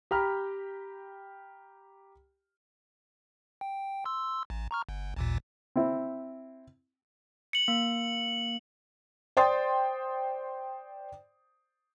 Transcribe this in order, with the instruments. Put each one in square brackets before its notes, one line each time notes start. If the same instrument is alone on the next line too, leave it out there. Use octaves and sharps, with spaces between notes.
[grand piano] G4 G5 A#5 B5 F6
[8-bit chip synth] G5
C6 E6
A1
A#5 C#6 F6
G1
A1 D#2 A#2
[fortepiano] C4 E4
[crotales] C#7 F#7
[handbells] A#3
[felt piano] C5 D5 G5 C6 D#6 A6